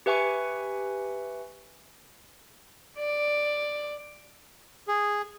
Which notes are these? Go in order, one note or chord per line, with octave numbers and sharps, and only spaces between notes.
G4 B4 E5 G#5 C#6 C#7
D5
G#4